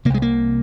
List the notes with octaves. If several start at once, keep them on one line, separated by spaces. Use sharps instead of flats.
C2 C3 G#3 A#3
A#3